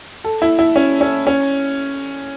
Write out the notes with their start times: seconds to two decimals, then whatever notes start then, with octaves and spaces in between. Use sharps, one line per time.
0.24 A4
0.42 E4
0.59 E4
0.76 C#4
1.01 C#4
1.27 C#4